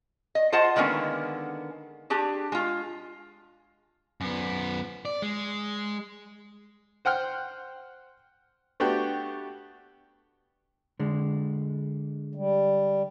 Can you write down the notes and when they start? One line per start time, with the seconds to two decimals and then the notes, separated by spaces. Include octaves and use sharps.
0.35 D#5
0.52 F4 G#4 C5 D#5 F#5 A5
0.76 D3 D#3 G#3 A#3 B3 C#4
2.10 D4 G4 G#4
2.52 G#3 F4
4.21 F#2 B3
5.05 D5
5.22 G#3
7.05 C5 F#5 G5 F6
8.80 A3 B3 D4 F#4 G4
10.99 D3 G#3
12.35 G3